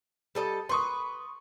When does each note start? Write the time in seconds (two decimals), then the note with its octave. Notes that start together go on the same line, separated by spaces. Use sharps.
0.35 G3 A4 D#5
0.69 B4 C6 C#6 D#6